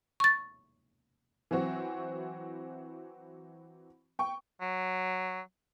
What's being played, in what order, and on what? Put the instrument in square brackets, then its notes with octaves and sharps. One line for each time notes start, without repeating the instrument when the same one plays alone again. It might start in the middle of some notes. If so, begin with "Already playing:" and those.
[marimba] C#6 A6
[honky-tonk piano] E3 F#3 C4 F#4
G5 C#6
[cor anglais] F#3